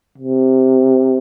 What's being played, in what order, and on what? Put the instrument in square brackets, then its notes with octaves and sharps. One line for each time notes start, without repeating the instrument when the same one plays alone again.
[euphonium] C3